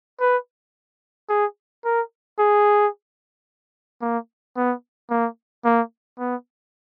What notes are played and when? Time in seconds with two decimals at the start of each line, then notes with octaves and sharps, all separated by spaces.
0.20 B4
1.29 G#4
1.84 A#4
2.38 G#4
4.01 A#3
4.57 B3
5.10 A#3
5.65 A#3
6.19 B3